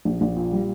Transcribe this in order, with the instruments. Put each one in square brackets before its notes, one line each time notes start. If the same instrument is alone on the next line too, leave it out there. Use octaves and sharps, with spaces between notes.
[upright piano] A#1
A#1
A#2
G3